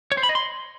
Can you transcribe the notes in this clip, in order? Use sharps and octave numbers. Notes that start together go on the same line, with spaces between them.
C#5
C5
B5
D#5
C6